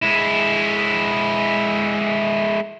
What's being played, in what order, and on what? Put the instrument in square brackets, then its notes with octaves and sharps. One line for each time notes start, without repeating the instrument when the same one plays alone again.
[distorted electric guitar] G#3 E4